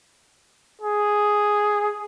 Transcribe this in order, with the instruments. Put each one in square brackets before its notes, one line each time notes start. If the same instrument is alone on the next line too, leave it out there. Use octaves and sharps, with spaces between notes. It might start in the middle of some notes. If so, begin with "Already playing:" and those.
[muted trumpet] G#4